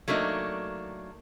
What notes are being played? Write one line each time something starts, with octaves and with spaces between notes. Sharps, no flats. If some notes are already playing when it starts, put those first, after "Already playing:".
F#3 A3 A#3 D4 D#4